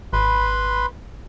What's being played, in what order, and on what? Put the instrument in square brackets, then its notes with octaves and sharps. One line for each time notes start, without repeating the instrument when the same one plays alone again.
[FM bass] G#1 [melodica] B4 B5 C6